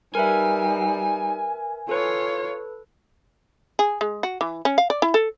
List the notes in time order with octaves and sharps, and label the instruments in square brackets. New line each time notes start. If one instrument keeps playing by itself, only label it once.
[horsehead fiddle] G3 D#4 [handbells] A#4 B4 E5 [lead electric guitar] G#5
[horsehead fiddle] F4 C#5 [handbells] A4 B4
[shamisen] G#4
G#3
F#4
E3
C#4
F5
D5
E4
A4